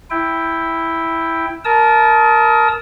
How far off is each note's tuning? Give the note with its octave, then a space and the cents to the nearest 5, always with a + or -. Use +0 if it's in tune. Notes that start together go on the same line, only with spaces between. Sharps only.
E4 +0 G5 +10
A#4 +0 A5 -20 D#6 +35